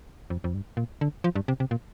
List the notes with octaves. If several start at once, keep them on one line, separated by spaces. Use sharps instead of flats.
F2
F2
G2
A#2
D3
F3
G2
C3
C3
A#2